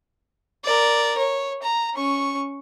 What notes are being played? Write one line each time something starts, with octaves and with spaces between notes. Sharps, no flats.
A#4 D5
C#5
A#5
C#4 C#6